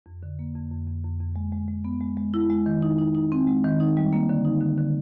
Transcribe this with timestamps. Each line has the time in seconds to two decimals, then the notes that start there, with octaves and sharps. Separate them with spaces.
0.06 F2
0.23 D3
0.39 A#3
0.55 F2
0.71 F2
0.87 F2
1.04 F2
1.20 F2
1.36 G#3
1.52 G#3
1.68 G#3
1.85 B3
2.01 G#3
2.17 G#3
2.34 E4
2.50 G#3
2.66 D#3
2.82 D#4
2.98 D#4
3.15 D#4
3.32 C4
3.47 G#3
3.64 D#3
3.80 D#4
3.97 G3
4.13 A#3
4.29 D3
4.45 D#4
4.61 D3
4.78 D3